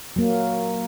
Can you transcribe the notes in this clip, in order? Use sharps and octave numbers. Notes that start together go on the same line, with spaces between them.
F#3 A#3